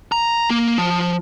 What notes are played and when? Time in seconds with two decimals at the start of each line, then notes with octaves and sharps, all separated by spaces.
0.12 A#5
0.50 A#3
0.78 F3